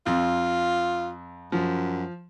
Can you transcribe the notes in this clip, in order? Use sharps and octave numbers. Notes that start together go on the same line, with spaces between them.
F2 F4
F#2 F3